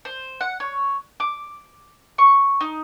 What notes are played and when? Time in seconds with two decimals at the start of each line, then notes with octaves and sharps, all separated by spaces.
0.05 C5
0.40 F#5
0.60 C#5
1.20 D6
2.18 C#6
2.61 D#4